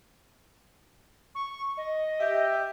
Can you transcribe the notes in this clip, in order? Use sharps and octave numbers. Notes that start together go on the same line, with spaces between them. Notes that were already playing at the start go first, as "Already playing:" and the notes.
C#6
D#5
G4 E5